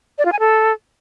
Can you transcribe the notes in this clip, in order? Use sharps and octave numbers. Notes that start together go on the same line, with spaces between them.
D5
F4
G#5
A4